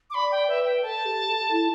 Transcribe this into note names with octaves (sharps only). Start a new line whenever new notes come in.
D6
D5 B5
G5
B4 E5
G5
A4 A5
G4
A4
E4